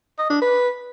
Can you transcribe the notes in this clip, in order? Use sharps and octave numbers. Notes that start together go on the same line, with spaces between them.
D#5
D4
B4